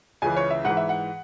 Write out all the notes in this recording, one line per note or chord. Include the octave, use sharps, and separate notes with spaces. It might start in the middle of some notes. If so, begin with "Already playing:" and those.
C#2 C#3 E3 G#5
C#5
E5
G#2 E3 F#5
E5
F#5